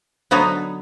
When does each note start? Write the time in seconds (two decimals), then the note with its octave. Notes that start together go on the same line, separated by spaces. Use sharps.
0.31 D3 F#3 B3 D#4